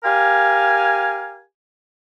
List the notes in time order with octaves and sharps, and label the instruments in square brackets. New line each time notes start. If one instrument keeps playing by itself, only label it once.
[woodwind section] G4 A#4 F5 G#5